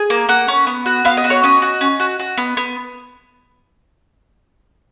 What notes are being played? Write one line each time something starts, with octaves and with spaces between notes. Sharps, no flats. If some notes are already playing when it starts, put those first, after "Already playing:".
Already playing: G#4
A#3
A#3 F#5
C#4
B3
F#4
B3 F5
D#5
F#4
C#5
C#4 D#5
F#4
C#4
F#4
F#4
B3
B3